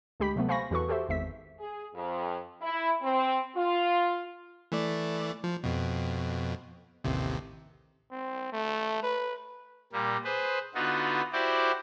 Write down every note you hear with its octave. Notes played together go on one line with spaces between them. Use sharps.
D2 G#3 G4 B5 B6
C3 F#3 A3 B3
C5 F5 G#5 B5 C#6 A#6
E2 E3 F#4 A4 B4 C#6
F#4 G4 A4 C5 E5
G#1 E2 E5 B6
G#4
F2
E4
C4
F4
E3 A3 D5
F3
F2 B2
A1 D#2 C3
C4
A3
B4
A#2 G3 A#3
G#4 B4 C5
D3 B3 D#4 F4 F#4
E4 F#4 G4 C5 D5